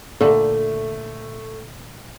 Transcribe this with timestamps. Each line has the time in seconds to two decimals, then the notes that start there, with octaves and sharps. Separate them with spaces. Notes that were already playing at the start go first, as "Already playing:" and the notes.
0.21 A#2 D3 A3